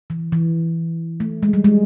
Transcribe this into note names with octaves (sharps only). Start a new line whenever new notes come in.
E3
E3
A3
G#3
G3
G#3